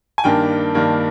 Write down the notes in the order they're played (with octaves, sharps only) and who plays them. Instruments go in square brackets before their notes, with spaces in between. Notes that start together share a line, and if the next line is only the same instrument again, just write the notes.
[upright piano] G#5
G2 D#3 A#3 D4 G5
G2 D#3 A#3 D4